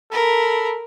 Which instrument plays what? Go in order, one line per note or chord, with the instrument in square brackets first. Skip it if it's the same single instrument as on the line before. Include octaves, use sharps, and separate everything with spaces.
[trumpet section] A4 B5 [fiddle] A#4